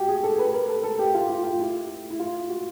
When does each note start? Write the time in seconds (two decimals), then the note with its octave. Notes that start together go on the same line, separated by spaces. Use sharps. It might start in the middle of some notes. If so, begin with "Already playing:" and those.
Already playing: F#4 G4
0.08 G#4
0.23 A4
0.39 B4
0.54 A#4
0.68 A4
0.83 A4
0.99 G4
1.14 F4
1.29 F4
1.44 F4
1.59 E4
2.10 E4
2.20 F4
2.49 F#4